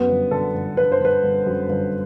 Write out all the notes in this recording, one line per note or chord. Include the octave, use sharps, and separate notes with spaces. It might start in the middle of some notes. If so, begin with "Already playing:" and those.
Already playing: F#2 B3
G1
D3 A4
G1
G1 B4
C5
G1 B4
G1
F#2
G1